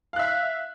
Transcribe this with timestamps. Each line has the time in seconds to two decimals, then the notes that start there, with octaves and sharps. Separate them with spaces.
0.13 F5
0.16 F#6
0.19 E5